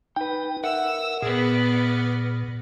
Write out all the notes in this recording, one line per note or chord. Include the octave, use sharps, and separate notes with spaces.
D#4 B4 G5
A#4 E5 F#5 E6
A#2 B3 G#4 D5